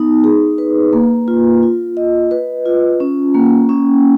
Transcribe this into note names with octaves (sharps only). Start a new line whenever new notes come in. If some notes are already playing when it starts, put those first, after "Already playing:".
Already playing: B3 D#4
G#4
B4
A#3
F4
F4
D#5
B4
F4
C#4
A#3
C#4